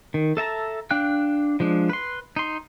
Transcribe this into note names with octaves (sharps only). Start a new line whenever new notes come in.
D#3
A4 E5 A5 A#5
D4 F5 G5 F#6
F3 G#3 D4
B4 C6
D#4 C6